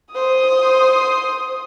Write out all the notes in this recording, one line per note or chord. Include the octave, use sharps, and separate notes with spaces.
C5 D#6